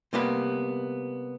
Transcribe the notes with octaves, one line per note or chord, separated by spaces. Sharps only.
C3 G3 A#3 B3 B4